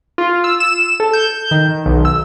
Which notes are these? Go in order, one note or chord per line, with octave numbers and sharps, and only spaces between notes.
F4
E6
E7
A4
G6
D#3
B1
E6